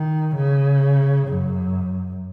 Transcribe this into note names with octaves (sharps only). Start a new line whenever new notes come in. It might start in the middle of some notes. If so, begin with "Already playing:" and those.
Already playing: D#3
C#3
F#2